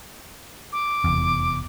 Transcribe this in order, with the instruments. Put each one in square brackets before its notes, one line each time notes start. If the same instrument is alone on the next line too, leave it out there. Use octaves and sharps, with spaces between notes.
[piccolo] D6
[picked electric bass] F1 E2